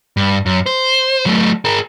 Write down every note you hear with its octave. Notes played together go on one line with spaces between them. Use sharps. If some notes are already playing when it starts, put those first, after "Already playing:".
G2
F#2
C5
F#3 A3
G#4 A#4